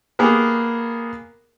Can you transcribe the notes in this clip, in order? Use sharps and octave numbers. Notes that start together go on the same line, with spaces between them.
A#3 B3 G4 G#4 A#4